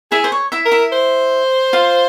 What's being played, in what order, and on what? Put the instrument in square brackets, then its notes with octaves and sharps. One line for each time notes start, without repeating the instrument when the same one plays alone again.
[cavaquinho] E4 E5 [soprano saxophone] G#4
[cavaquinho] C5
C#5
E4 E5
[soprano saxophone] A#4
[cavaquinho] E4 E5
[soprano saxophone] C5
[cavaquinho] F4 F5